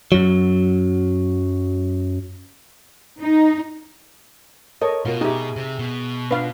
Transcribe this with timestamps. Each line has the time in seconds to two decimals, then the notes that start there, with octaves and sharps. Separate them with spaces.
0.12 F#2 F#3
3.19 D#4
4.81 A4 A#4 C#5 D#5
5.05 B2 F4 F#4 A#4
5.21 D#4 G4 G#4 E5
5.56 C3
5.79 B2
6.31 D4 F4 B4 F5